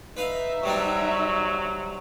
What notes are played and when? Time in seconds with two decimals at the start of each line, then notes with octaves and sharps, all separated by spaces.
0.17 D#4 B4 E5 F5
0.64 C3 F#3 G3 D4